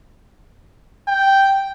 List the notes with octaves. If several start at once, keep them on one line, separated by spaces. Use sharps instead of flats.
G5